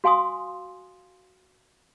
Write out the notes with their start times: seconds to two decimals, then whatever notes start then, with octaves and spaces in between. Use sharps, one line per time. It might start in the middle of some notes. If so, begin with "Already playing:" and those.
0.04 F#4 F5 G#5 C6 D#6